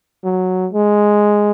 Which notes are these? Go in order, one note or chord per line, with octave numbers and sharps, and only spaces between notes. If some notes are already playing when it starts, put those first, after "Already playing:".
F#3
G#3